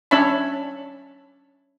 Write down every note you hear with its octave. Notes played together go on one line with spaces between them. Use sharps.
C#4 D4 C#5 E5 A5 B5